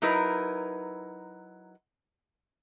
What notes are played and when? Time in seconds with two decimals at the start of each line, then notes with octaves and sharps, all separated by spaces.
0.02 F#3 D#4 E4 A#4 B4